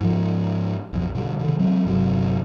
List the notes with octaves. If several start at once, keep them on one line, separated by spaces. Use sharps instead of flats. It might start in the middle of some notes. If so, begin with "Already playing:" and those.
G#2 F3
B1 F2
B2 D3 G3
C3 D#3
F#3 G#3 C4
G1 C3 F#3